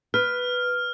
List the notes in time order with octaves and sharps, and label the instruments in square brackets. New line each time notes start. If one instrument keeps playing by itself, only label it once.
[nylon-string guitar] B4 [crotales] F6